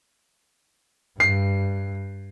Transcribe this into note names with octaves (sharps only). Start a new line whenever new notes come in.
G2 C7